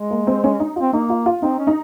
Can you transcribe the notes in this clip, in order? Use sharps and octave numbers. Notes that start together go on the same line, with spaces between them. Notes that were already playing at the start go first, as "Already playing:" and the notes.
Already playing: G#3
A#3
C4
C#4
D#4
C4 F4
A#3 D#4
F4
F4
C4 D#4
C#4
D#4